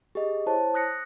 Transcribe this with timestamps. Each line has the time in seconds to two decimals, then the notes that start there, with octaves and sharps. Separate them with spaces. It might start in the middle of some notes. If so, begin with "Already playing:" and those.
0.15 G4 G#4 D#5
0.46 E4 C5 C#5 A5
0.74 D#6 F#6 A#6 C#7